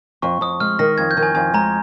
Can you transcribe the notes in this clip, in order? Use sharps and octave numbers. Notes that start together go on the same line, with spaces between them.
F2 C#6
F2 D#6
G#3 F6
D#3 A#6
F2 G#6
G6
D#3
G#5
F2 G#5
G#3 A#5